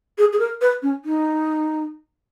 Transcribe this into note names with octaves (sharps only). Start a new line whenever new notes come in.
G#4
G#4
A#4
B4
C#4
D#4